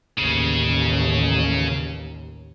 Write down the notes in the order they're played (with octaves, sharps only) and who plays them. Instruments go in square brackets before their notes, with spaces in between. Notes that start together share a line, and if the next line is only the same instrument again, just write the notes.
[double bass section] A1 D#2 [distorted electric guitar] C#3